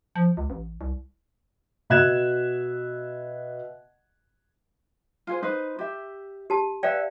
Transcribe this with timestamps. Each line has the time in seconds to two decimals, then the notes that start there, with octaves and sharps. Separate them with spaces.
0.16 F3
0.37 C#2
0.50 A1
0.81 C2
1.90 B2 E5 F#6 G#6 E7
5.27 F4 G#4 C5
5.43 D#4 B4 C5
5.79 G4 E5
6.50 G4 A5
6.83 B4 D5 E5 F5 G5